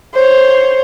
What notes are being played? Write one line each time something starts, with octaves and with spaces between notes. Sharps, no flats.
C5 C#5